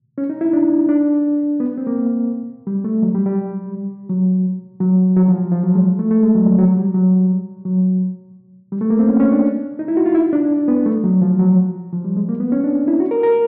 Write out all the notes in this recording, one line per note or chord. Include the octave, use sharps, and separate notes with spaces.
C#4
D#4
E4
D4
D4
B3
C4
A#3
G3
A3
F#3
G3
G3
F#3
F#3
F#3
F3
F3
F#3
G#3
A3
A3
G#3
F#3
F3
F#3
G3
F#3
F#3
G3
A3
A#3
C4
C#4
C#4
D4
D#4
E4
F#4
F4
E4
D4
B3
A3
F#3
F3
F#3
F3
G3
G#3
A#3
B3
C#4
D4
E4
F#4
A#4
A#4